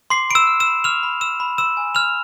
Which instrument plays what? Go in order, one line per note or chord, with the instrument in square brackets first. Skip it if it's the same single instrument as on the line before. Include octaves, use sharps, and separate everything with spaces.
[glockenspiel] C6 D6 C7
B5 D7
E6 E7
F6
E6 E7
B5
D6 F6 F7
B5
E6 F6 E7
B5
C6 E6 E7
G#5
F6 F7